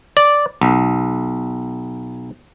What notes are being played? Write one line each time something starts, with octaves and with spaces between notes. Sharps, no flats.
D5
B1